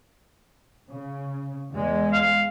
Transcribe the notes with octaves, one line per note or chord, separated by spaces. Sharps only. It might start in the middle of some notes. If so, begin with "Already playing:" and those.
C#3
E2 G#3
F5